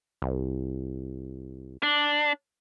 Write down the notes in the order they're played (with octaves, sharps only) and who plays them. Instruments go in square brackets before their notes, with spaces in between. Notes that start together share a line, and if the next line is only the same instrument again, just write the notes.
[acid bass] C2
[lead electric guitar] D4